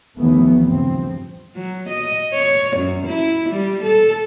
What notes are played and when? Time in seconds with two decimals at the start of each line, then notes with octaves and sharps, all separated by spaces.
0.19 D#2 E3 F3 A3 B3
0.65 G2 C#3 F3 C4
1.56 F#3
1.89 D#5
2.33 C#5
2.77 F#2
3.07 E4
3.49 G3
3.83 A4